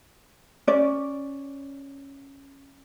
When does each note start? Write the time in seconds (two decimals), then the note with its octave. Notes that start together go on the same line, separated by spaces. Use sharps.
0.67 C#4 D5